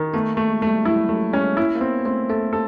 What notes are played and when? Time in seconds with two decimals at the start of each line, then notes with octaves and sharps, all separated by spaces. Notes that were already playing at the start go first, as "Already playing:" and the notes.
Already playing: D#3
0.14 A3 B3
0.32 A#3
0.37 A3
0.50 G#3
0.62 A3
0.67 G3
0.85 F#3 E4
1.09 F#3 A3
1.33 G#3 C#4
1.57 A#3 E4
1.75 A#3
1.81 B3 C4
2.05 A3 C4
2.29 A3 A4
2.53 A4